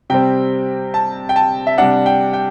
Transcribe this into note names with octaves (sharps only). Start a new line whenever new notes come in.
C3 G3 C4 G5
A5
G5
A5
E5
C3 G3 D4 F#5
G5
G5